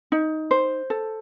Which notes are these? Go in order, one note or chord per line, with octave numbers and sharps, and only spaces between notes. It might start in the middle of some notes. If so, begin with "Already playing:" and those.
D#4
C5
A4